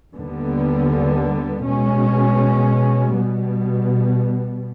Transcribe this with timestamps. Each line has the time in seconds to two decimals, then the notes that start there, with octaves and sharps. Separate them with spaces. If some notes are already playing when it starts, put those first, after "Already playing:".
0.14 D#2 D3 G3 B3
1.65 B2 G#3 C#4
3.16 B2 G3 B3